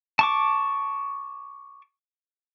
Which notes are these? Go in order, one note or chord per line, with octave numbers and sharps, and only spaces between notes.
A5 C#6 D6